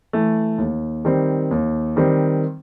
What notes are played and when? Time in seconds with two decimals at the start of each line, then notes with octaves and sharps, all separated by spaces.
0.13 E3 A3
0.58 D#2
1.05 D#3 G3 C4
1.51 D#2
1.96 D#3 G3 C4